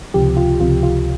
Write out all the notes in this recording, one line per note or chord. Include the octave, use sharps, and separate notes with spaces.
C#2 C3 F3 G4
F4
C#2 C3 F3 F4
F4